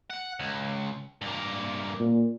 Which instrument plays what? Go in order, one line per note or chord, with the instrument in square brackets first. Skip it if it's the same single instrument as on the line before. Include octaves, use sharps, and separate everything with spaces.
[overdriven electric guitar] F#5
C#2
G2 A#3
[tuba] A#2